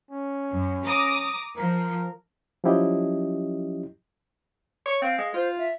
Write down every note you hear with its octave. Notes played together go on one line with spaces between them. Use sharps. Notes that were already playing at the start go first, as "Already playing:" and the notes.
C#4
F#2
A#5 D6 D#6
F3 A#4
F3 F#3 C#4 E4 G4 D#5
C#5
C4 F5
G#3
F4 C5
E5